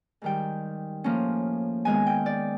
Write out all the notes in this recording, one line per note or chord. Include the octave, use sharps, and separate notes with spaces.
G#2 D#3 G3 G5
A2 F3 A#3 C#4
G#2 D#3 G#3 B3 G#5
G5
D5